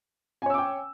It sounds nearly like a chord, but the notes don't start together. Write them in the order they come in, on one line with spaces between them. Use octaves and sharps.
G#5 C#5 E6 D6 G5